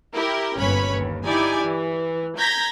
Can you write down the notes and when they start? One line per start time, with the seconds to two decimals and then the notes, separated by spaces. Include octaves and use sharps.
0.14 E4 G4 A#4
0.58 G1 A#2 C#4 B4 C#5 B5
0.93 D#2
1.26 D#4 E4 G4 D5 G#5
1.64 E3
2.37 A#5 G6 G#6 A#6 B6